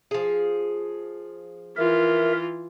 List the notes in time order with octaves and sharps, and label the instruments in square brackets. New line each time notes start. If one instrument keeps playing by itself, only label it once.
[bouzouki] F3 G#4
[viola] E3 F4 [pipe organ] A#4 E5